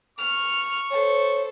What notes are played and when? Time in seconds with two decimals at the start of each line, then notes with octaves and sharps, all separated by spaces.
0.19 C#6 F6
0.90 A4 C5 C#5